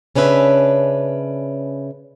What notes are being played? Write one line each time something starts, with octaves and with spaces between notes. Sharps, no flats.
C#3 C#4 D4 B4 E5